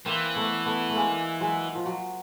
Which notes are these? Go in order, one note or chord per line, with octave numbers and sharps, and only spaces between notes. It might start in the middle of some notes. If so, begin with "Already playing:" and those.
E3 A#3 C4
A3 B3
A3 B3
A3
G#3 A#3
F#3 G#3
F3
F#3